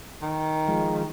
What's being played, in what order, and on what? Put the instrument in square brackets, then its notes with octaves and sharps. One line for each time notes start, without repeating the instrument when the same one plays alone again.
[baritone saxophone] D#3
[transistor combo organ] F3 G#3